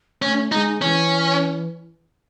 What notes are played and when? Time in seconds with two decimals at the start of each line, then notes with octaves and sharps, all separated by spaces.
0.22 A3 C#4
0.52 G#3 D#4
0.82 E3 C#4